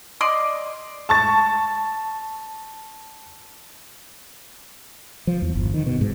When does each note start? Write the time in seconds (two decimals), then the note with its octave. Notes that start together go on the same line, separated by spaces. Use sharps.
0.21 D5 D#5 C6
1.09 A5 C#6 A6
5.27 F3
5.42 E2
5.55 G1
5.74 D#3
5.86 B2
6.01 G#2